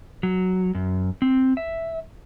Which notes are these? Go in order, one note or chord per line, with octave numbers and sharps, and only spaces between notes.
F#3
F#2
C4
E5